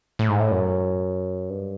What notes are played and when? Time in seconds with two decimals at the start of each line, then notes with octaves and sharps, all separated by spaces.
0.19 A2
0.29 G#2
0.40 A2
0.52 F#2
1.49 G2